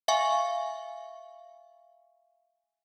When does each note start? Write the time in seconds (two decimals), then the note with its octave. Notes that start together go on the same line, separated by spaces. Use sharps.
0.08 E5 F5 G#5 C#6